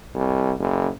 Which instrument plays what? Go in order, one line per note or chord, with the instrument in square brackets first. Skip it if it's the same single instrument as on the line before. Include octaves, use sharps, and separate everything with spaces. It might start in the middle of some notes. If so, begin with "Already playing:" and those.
[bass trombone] C2
F#1